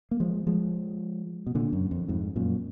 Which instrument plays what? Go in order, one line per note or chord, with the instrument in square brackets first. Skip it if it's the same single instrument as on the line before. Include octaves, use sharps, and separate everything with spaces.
[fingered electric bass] A#3
F3 G#3
F3 G#3
B2
A#2 D3
F#2
F2
F2 G#2
F#2 A#2